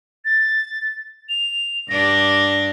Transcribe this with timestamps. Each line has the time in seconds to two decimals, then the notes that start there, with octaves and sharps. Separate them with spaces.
0.25 A6
1.29 F7
1.89 G2 D4 G4 A#6